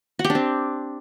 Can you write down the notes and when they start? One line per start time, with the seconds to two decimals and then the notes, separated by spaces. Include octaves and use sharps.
0.19 F#4
0.24 G4
0.30 D4
0.35 C4